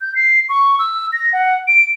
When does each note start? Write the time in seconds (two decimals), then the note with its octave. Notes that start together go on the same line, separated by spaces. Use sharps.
0.01 G6
0.15 C7
0.49 C#6
0.79 E6
1.12 A#6
1.33 F#5
1.68 D7